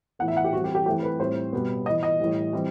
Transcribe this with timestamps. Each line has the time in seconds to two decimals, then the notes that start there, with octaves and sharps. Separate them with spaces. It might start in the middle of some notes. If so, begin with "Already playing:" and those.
0.19 A2 E3 B3 F#5
0.28 E5
0.37 F#5
0.44 G4
0.53 E3 G3 C4 F#4
0.64 G4
0.75 G4
0.86 E3 A3 C4 G4
1.03 B4
1.19 A2 G3 C4 C5
1.53 B2 G3 B3
1.86 E3 B3 D#5
2.03 D#5
2.20 A2 E3 G3
2.53 E3 G3 C4